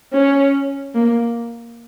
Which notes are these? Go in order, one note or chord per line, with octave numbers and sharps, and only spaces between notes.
C#4
A#3